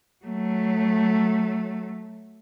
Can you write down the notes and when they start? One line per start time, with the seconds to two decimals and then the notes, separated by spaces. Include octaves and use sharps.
0.25 F#3 A3